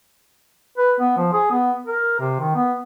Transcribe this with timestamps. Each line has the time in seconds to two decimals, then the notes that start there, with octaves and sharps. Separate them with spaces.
0.78 B4
1.00 B3
1.17 F3
1.33 G#4
1.51 B3
1.86 A#4
2.20 C3
2.40 D#3
2.55 B3